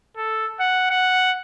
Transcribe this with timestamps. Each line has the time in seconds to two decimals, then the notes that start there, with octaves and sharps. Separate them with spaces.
0.17 A4
0.60 F#5
0.90 F#5